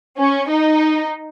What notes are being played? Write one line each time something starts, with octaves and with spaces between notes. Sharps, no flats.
C#4
D#4